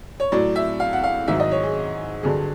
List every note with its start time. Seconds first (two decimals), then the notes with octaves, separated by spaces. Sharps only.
0.20 C#5
0.32 A2 F#3 D5
0.56 E5
0.80 F5
0.93 F#5
1.04 F5
1.28 G#2 D#3 F#3 E5
1.40 D#5
1.51 C#5
1.63 G#4
2.23 G2 D3 F#3 G#4